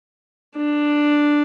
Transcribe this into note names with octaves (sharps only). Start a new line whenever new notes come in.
D4